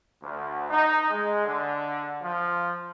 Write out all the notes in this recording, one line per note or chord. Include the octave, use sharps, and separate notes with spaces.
D2
D#4
G#3
D3
F3